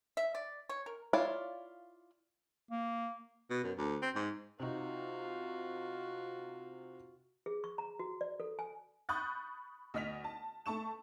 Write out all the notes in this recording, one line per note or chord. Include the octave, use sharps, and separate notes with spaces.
E5
D5
C#5
A#4
E4 F4 C#5 D5 F5
A#3
B2
F#2
D2
C4
G#2
C3 D#4 F4 F#4
G#4
C#6
A#5
F#4
D5
A4
G#5
B5 C#6 D#6 F#6 G6 A6
D2 D#5 F6 B6 F7
A5
A3 A5 C#6 E7